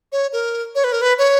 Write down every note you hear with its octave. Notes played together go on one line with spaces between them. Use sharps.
C#5
A#4
C#5
B4
A#4
B4
C#5